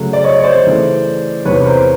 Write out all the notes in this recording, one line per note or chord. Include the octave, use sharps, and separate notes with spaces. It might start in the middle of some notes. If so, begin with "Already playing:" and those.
Already playing: C#3 F#3 A3
D5
C#5 D#5
C#5
C5 D5
C#3 E3 A3
E2 C3 E3 B4 C#5
A#4 C5